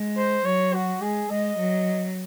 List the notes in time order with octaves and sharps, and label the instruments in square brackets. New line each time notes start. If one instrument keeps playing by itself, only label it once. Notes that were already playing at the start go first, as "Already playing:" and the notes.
Already playing: [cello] G#3
[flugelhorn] C5
[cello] F#3 [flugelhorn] C#5
[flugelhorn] F#4
[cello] G#3 [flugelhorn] G#4
[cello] G#3 [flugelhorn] D#5
[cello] F#3